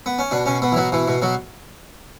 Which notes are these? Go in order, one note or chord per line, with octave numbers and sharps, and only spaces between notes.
B3
C#4
B2 D4
B2 C#4
B2 B3
E3
B2 F#3
B2 E3
B2
B2 F#3